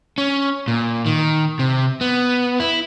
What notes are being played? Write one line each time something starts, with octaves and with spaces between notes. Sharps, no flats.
C#4
A#2
D#3
C3
B3
E4